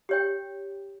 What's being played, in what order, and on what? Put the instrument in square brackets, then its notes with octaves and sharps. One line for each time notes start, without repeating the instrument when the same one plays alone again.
[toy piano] G4 C#5 G5